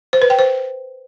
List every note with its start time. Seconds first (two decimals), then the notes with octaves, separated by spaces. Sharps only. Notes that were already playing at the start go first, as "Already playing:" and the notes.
0.13 C5
0.22 B4
0.30 G5
0.39 C5